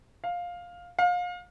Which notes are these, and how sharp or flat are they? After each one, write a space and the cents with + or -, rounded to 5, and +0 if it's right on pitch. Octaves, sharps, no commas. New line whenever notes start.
F5 +10
F5 +30